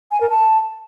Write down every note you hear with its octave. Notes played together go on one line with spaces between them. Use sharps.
G#5
A#4
A5